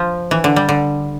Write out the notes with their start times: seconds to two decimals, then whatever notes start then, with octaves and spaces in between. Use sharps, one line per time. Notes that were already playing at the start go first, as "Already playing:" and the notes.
Already playing: F3
0.31 E3
0.44 D3
0.56 G3
0.69 D3